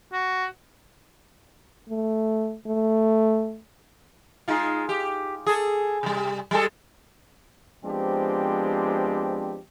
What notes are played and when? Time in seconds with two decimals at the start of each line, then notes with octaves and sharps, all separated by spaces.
0.13 F#4
1.89 A3
2.67 A3
4.48 G#3 D#4 F4
4.89 G4
5.47 G#4 A4
6.03 C3 G3
6.51 G3 G#3 A4
7.85 F3 G#3 B3 C4 D4 G4